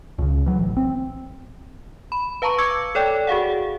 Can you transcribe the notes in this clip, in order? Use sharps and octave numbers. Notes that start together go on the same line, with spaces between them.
C#2 C#3
E3 F#3
A1
C4
B5
B4 F5 A5 A#5 C#6
C#6 D6 E6 G#6 C#7
A4 C#5 D5 G5
F#4 G#4 F5 F#5